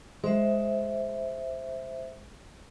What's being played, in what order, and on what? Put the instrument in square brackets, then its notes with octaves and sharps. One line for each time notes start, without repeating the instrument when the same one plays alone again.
[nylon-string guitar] G#3 [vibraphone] C5 E5